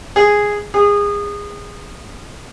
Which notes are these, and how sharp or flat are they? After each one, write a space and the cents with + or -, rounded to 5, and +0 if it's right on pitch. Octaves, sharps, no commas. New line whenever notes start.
G#4 -5
G#4 -25